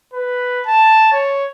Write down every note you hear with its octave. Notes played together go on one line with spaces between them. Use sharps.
B4
A5
C#5